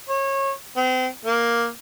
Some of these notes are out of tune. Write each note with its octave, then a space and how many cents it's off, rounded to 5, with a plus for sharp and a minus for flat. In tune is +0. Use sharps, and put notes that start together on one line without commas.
C#5 -25
C4 -35
A#3 +5